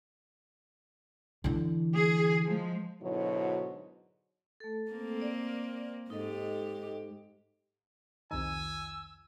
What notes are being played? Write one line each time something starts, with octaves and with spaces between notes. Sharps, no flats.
D3 E3
G#4
F3 G#3
G#2 B2 D3 F#3 E4 C#5
A3 A4
A#3 C4
D5
G#2 D#4 G4 A4 D#5
C2 F2 D#3 G#5 E6